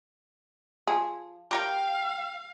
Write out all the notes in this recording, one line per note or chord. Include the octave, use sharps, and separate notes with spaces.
F3 G#4
G4 A#4 F5 G5